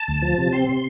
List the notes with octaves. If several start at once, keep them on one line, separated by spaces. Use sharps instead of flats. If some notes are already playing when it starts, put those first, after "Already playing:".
Already playing: A5
D2
F3
C3
C4 C6
C3